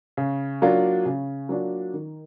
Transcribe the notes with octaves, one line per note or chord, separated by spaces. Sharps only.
C#3
F#3 A#3 D4 F4
C#3
F#3 A#3 D4 F4
D#3